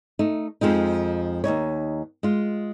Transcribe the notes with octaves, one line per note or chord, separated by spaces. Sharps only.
A3 D#4
F2 F3 G#3 D#4
D#2 A#2 D#4 C#5
G#3 F4